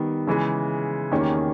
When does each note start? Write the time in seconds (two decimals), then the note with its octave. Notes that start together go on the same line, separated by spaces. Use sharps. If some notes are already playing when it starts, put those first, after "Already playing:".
Already playing: D#3 G3 B3
0.27 C#3 E3 G#3
1.12 E2 D#3 A#3 C#4 G4